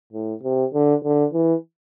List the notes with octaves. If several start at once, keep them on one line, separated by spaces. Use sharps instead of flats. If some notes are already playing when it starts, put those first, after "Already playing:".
A2
C3
D3
D3
E3